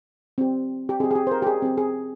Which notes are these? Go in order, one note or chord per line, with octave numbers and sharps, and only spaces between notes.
C4 G4
G4
C4 G4 G#4
G#4
G4
C5
A#4
G4
G#4
C4 G4
G#4